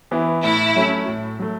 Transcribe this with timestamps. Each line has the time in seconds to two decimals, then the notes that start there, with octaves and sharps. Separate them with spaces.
0.11 E3 B3 E4
0.44 A2 E4
0.76 F#3 A3 C#4
1.08 A2
1.39 F#3 A3